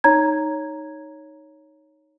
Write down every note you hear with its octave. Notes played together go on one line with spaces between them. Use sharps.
D#4 C#5 A#5 G#6